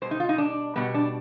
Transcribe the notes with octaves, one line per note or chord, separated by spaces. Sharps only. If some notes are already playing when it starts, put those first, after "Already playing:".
B2 G3 C5
D#4
F4
D#4
D4
B2 G3 B3
D4